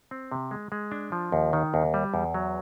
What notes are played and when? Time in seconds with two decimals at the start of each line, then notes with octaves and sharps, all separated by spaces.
0.11 C4
0.32 C3
0.51 G#3
0.72 G#3
0.92 D4
1.12 F3
1.32 D#2
1.53 D#3
1.74 D#2
1.94 G3
2.14 E2
2.34 F#3